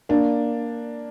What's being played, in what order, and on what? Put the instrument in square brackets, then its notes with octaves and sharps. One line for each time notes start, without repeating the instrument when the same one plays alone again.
[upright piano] A#3 D4